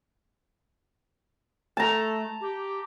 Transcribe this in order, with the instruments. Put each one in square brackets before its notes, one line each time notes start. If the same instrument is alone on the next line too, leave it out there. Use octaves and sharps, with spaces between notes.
[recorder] A3 [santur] A5 A#5
[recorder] G4